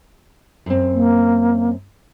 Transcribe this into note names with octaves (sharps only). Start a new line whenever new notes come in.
F#2 C4
A#3